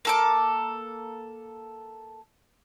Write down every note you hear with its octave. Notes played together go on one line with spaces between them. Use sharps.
A#3 A4 D6